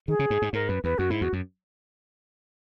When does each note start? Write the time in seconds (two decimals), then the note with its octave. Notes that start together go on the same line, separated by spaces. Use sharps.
0.08 D#3 G#4
0.19 C#3
0.30 G#2
0.42 G#2
0.53 G#2 A#4
0.69 F#2 B4
0.84 E2 B4
0.98 F#2 F#4
1.10 G#2 E4
1.21 E2 F#4
1.33 F#2